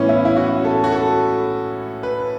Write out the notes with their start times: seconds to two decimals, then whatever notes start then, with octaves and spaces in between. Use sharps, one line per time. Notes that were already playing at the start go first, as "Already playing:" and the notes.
Already playing: A2 E3 B3 C#4
0.09 E4
0.25 E4
0.36 F#4
0.65 A4
0.84 F#4
0.92 A4
2.03 B4